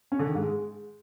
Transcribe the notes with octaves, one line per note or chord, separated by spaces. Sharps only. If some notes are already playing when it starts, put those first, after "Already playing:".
C#4
D3
D#3
G#2
G#3